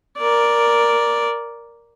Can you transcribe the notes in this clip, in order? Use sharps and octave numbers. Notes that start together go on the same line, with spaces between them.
A#4 D5